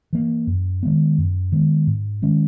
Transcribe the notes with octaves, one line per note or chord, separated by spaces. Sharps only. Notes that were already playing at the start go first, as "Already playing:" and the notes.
E3 A#3
F#2
D#3 G#3 B3
F#2
D#3 G#3 B3
G#2
D#3 G#3 C#4